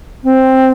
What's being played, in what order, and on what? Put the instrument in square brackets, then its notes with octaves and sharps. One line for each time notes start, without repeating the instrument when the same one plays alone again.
[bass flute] C4